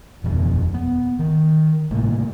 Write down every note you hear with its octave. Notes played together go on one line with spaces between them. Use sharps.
D#1 F2 B2
B3
D#3
A2 C3 A3 A#3